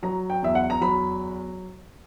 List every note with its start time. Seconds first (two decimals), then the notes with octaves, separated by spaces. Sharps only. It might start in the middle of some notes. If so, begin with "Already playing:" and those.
0.03 F#3 A#5
0.30 G5
0.42 E2 E5
0.55 F#5
0.70 A#5
0.81 F#3 B5